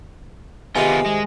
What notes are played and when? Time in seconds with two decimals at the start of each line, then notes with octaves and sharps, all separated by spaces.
0.76 G#2 C3 D#3 B3 F4 G#5
1.06 G#3